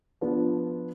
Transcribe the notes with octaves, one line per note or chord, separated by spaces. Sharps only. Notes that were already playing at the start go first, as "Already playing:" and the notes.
F3 B3 D4